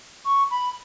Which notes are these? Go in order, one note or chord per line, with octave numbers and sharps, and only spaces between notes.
C#6
B5